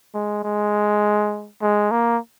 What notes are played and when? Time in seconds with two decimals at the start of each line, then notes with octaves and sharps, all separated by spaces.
0.14 G#3
0.43 G#3
1.62 G#3
1.91 A#3